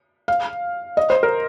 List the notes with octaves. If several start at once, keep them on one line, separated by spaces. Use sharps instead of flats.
F5
D#5
C5
A#4